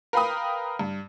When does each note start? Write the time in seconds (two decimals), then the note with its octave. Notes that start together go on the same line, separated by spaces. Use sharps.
0.13 A#4 B4 F5 G5 B5 D#6
0.79 G2